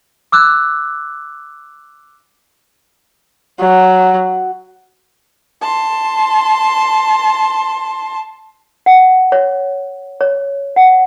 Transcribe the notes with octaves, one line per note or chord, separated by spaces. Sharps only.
D6 E6 F#6
F#3
A5 C6
F#5
C#5
C#5
F#5